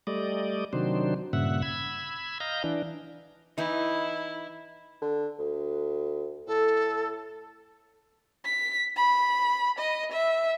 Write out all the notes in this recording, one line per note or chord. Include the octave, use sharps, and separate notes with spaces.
G3 A3 D5 D#5
C3 D#3 F#3 D4 C5
G2 A#2 C#3 E5 F#5
B5 E6 G#6
D#5 F5 A#5 G6
E3 D4
E3 D#4 E4
D3
D2
A2 A4
B6
B5
D#5
E5